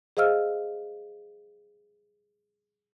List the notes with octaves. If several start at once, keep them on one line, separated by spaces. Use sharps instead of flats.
G#4 C5 D#5 F5 E6 F6